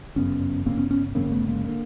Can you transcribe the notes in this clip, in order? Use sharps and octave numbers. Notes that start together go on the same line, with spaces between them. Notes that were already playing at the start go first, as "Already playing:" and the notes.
G1 F#2 C#3 B3 C#4
G1 F#2 C#3 A#3 C4
B3 C#4
B3 C#4
G1 F#2 C#3 A#3 C4
A3 B3
G#3 A#3
D3 A#3